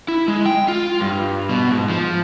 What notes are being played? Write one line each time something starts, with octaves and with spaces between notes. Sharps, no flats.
E4
G#3
G5
F4
G2
B2
G#2
F3